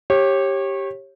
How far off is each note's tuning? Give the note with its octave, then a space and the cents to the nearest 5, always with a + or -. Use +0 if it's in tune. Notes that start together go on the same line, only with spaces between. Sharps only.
G4 +0 C#5 -25